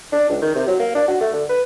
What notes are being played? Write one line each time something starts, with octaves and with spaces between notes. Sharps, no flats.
D4
C#2
D#3
C3
F#3
A#3
D4
F#4
A3
D3
B4